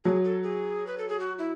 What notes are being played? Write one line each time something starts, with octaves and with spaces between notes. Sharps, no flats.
F#3 G#4
A4
G#4
B4
A4
G#4
F#4
E4